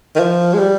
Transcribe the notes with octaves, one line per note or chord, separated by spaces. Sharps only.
D#3
F3
G#3
G3